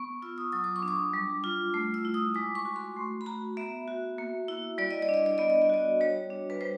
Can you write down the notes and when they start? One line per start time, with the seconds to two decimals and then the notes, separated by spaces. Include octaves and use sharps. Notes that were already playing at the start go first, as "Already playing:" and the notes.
Already playing: B3 C#6
0.22 F4 E6
0.38 D#6
0.52 F#3 D#6
0.64 D6
0.76 C#6
0.83 D4
0.88 D6
1.13 G3
1.44 F4
1.74 A3
1.94 E6
2.05 E4
2.14 D#6
2.35 G#3 D6
2.55 C#6
2.65 F#4
2.76 C6
2.96 A3
3.21 B5
3.26 F#4 A#5
3.57 B3 E5
3.88 F#4
4.18 A#3
4.48 E4
4.78 G3 D5
4.91 D#5
5.02 D5
5.09 D4
5.14 D#5
5.26 D5
5.38 B3 D#5
5.50 D5
5.62 D#5
5.70 F#4 D5
6.01 G3 C#5
6.30 D4
6.50 B4
6.61 G3 C5